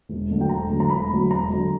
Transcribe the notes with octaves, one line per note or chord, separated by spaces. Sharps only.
E1
D2 D3 F#3
G5
E1 A#5
D2 D3 F#3
A#5
E1 B5
D2 D3 F#3
E1 A#5
D3 F#3